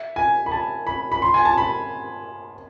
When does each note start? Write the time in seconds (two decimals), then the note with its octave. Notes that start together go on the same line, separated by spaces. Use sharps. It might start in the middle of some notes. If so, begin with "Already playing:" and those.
Already playing: E5
0.16 G#5
0.46 B5
0.52 A5
0.87 B5
1.12 B5
1.22 C6
1.34 G#5
1.45 A5
1.58 B5